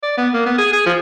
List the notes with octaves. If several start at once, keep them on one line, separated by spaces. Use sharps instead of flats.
D5
B3
A#3
B3
G#4
G#4
F3